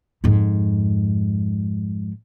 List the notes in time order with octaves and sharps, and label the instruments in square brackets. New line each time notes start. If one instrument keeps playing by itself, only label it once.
[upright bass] F2 G#2